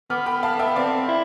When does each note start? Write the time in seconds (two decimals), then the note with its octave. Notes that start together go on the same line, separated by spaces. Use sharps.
0.10 B3 D6 F6
0.26 G5 B5
0.43 F5 A5
0.59 E5 G5
0.76 C4 D5 F5
1.08 E4